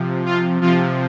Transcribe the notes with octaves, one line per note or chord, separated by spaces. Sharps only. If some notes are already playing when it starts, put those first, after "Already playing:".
Already playing: C3 F3
F4
C3 F3 F4